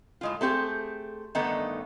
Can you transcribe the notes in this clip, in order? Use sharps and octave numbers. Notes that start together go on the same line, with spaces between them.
A2 G#3 F4
A3 C4 G4 G#4
G2 D3 D#3 A3 B3 D#4